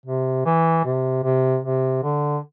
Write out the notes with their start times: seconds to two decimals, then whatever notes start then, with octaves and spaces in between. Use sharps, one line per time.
0.06 C3
0.45 E3
0.85 C3
1.24 C3
1.64 C3
2.03 D3